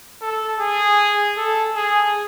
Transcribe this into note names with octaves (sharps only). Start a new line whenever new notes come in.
A4
G#4
A4
G#4